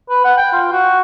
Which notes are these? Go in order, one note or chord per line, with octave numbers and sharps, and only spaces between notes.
B4
F#5
G5
F4
F#4